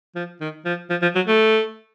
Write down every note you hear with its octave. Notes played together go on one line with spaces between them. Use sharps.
F3
D#3
F3
F3
F3
F#3
A3